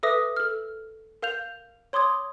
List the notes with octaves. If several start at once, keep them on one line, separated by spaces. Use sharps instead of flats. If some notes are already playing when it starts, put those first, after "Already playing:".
A4 B4 E5 D6 D#6 A#6
A4 F6
A#4 F5 G6 F7
C#5 C6 D6 D#6 G#6